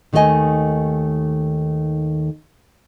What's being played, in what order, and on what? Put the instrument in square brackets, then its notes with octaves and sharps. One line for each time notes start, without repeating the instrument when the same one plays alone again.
[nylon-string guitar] D#2 D#3 A3 F#4 D#5 G#5